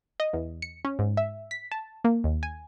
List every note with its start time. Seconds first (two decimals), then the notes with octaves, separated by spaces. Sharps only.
0.20 D#5
0.33 E2
0.62 C#7
0.85 C#4
0.99 G#2
1.17 E5
1.51 B6
1.72 A5
2.04 A#3
2.24 D#2
2.43 G#5